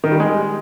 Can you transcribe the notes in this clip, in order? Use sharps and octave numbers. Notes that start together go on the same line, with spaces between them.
D#3
G3
G#3